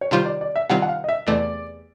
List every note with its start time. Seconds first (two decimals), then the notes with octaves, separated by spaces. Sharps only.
0.01 C#5
0.11 C3 D#3 G3 C4 F4 C5
0.25 D5
0.41 D5
0.56 E5
0.70 C3 D#3 G3 C4 F4 F#5
0.82 F#5
0.88 F5
1.04 D#5
1.09 E5
1.27 E2 C3 E3 A3 D5